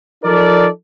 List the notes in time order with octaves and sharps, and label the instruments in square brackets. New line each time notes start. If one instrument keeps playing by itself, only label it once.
[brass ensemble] F3 D#4 A4 A#4 D5